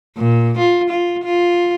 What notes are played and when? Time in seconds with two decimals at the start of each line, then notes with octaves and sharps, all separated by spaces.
0.17 A#2
0.58 F4
0.89 F4
1.23 F4